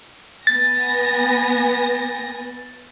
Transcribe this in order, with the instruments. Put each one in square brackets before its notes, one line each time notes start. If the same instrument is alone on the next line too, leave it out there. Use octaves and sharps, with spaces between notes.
[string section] B3 G#5 A#6 [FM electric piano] A6